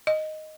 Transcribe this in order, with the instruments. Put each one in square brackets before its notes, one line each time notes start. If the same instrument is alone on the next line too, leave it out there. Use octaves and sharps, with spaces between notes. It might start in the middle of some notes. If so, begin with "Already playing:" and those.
[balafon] D#5